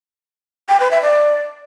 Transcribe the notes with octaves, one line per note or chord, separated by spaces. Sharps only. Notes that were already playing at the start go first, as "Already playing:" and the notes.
G5
B4
E5
D5